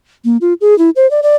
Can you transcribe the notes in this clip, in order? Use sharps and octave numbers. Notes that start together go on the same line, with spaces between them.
A#3
F4
G#4
E4
C5
D5
D5